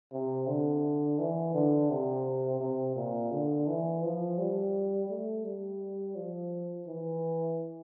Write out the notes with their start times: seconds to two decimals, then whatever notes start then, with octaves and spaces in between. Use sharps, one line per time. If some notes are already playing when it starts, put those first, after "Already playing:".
0.12 C3
0.47 D3
1.19 E3
1.54 D3
1.90 C3
2.60 C3
2.95 A#2
3.31 D3
3.68 E3
4.02 F3
4.38 G3
5.09 A3
5.44 G3
6.15 F3
6.87 E3